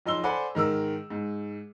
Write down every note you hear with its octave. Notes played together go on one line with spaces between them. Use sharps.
F#1 F3 D#4 C6 E6 G7
A4 C5 D5 F#5 G#5 B5
G#2 D#3 A#4 E6
G#2